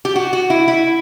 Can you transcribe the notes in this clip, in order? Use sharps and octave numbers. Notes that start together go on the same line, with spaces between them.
G4
F#4
F#4
E4
E4